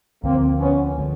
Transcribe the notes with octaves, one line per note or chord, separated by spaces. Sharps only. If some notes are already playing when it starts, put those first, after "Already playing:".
D2 D3 F3 A#3 C4
B3 C#4
D3 F3 G#3